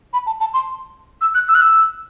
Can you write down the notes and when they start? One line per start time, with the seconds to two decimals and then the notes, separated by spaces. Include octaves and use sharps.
0.13 B5
0.26 A5
0.40 A5
0.54 C6
1.21 E6
1.34 F#6
1.48 E6
1.55 F#6
1.61 E6